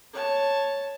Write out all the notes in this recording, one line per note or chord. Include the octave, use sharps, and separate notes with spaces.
C#5 A5